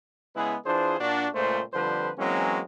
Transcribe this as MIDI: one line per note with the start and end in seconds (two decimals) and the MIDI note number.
0.35 0.55 49
0.35 0.55 56
0.35 0.55 59
0.35 0.55 64
0.35 0.55 68
0.35 0.55 71
0.66 0.96 52
0.66 0.96 62
0.66 0.96 65
0.66 0.96 68
0.66 0.96 72
0.99 1.27 46
0.99 1.27 62
0.99 1.27 66
1.34 1.62 37
1.34 1.62 46
1.34 1.62 56
1.34 1.62 57
1.34 1.62 72
1.73 2.10 41
1.73 2.10 50
1.73 2.10 53
1.73 2.10 55
1.73 2.10 71
1.73 2.10 72
2.18 2.60 52
2.18 2.60 54
2.18 2.60 56
2.18 2.60 58
2.18 2.60 60
2.18 2.60 61